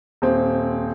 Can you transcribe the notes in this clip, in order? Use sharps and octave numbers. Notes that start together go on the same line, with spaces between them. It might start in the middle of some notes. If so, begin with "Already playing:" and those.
D#1 C4